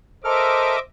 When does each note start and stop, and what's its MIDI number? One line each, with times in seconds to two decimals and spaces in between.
0.25 0.76 69
0.25 0.76 70
0.25 0.82 72
0.25 0.79 75
0.25 0.79 76
0.25 0.79 86
0.25 0.76 89